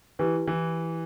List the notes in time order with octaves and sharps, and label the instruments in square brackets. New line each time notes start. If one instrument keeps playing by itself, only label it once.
[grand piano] E3 [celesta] E4 G4 B4
[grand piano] E3